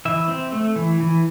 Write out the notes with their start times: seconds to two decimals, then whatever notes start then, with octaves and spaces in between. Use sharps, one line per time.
0.05 E3 E5
0.28 C4
0.52 A3
0.76 E3
1.00 E3